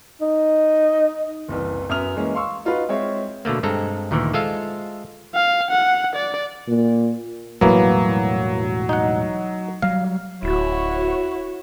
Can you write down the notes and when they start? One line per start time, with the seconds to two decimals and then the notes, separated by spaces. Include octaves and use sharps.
0.21 D#4
1.48 F#1 C2 E3
1.89 F#2 B3 E5 D#6 F6 F7
2.16 E3 G#3 A#3 C#4
2.34 F5 C6 C#6 E6
2.65 D#4 F4 F#4 B4
2.89 G#3 C4 C#5 E5
3.45 B2 D3 A3 A#3
3.63 G2 G#3 C4 A4 A#5
4.11 D2 A#2 D#3 E3
4.33 G#3 F4 A4 C5 E5 F5
5.35 F5
5.70 F#5
6.16 D5
6.68 A#2
7.61 E1 A2 E3 F#3 G3 A#3 B3
8.89 D#4 F#5
9.82 F#3 G3 F5
10.43 D1 E4 F#4 C#5